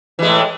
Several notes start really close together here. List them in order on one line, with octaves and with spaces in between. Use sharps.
E3 G#3 A2